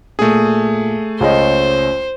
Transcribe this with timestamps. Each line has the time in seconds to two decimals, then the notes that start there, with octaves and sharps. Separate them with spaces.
0.19 A#2 A3 G#4
1.21 C#2 C#4 C5 D#5